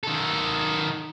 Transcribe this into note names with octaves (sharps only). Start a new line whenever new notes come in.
D#3 A4